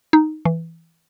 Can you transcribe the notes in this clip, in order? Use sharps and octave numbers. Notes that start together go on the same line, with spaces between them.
D#4
E3